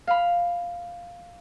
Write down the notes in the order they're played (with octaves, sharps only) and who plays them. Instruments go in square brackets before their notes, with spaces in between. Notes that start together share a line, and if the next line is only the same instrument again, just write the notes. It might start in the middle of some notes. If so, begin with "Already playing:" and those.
[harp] F5 B5